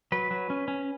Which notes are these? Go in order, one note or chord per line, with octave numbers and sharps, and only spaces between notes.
F#3 B4
F#3
C#4
C#4